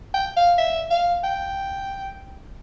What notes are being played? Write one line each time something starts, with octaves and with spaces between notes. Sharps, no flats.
G5
F5
E5
F5
G5